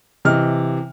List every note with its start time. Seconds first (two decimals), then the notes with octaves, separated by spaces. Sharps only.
0.25 C3 E3 D#5 F6